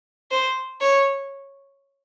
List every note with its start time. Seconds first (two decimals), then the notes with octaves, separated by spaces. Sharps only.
0.31 C5
0.81 C#5